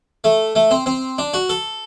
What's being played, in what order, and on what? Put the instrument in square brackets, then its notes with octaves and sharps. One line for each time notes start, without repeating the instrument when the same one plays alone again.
[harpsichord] A3
A3
C4
C4
D4
F#4
A4